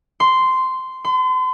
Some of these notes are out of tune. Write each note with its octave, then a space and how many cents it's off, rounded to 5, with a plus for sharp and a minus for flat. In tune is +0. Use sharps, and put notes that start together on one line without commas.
C6 -10
C6 -40